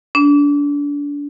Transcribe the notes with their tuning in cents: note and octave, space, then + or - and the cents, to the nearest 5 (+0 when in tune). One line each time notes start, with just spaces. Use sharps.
D4 -30